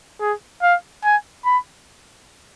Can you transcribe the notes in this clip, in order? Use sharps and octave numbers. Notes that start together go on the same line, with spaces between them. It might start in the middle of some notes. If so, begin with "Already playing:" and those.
G#4
F5
G#5
B5